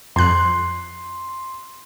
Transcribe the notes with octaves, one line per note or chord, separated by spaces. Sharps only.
F2 C6 F#6